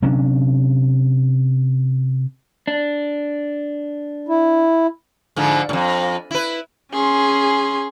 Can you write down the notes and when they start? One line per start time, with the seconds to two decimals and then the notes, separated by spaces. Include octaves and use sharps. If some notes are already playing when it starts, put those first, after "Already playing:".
0.02 C3 F#3 C#4 D4
2.68 D4
4.29 E4
5.36 G#2 D3 F3
5.69 F2 A2
6.31 E4 B4
6.93 C#4 G#4 C6